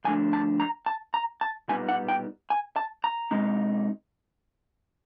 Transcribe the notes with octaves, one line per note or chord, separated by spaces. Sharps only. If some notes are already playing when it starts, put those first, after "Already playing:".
D2 D3 F3 A3 D4 G#5
A5
A#5
A5
A#5
A5
B1 A#2 G3 B3 D#4 G#5
F#5
G5
G#5
A5
A#5
B2 G#3 C4 D#4